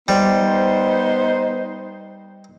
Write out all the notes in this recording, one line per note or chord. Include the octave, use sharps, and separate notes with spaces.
G3 B3 D#4 C5